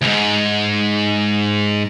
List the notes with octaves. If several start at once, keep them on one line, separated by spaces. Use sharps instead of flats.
D2 G#2